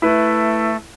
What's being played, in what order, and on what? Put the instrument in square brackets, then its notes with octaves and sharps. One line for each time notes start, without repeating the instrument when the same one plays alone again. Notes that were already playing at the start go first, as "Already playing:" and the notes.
[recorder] A3 [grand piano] E4 B4